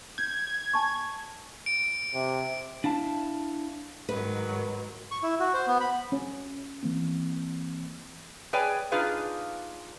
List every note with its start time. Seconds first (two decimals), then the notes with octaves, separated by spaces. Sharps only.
0.18 G6 G#6
0.74 G#5 A5 C#6
1.66 D7
2.14 C3
2.84 D4 E4 F5 A5
4.09 G#2 D#3 F#3 B4
5.11 C#6
5.23 E4
5.40 F#4
5.54 C5
5.68 B3
5.81 B5
6.12 C#4
6.83 E3 A#3 C4
8.53 G#4 B4 C#5 D5 G5 G#5
8.92 D4 D#4 F4 G#4 B4 F5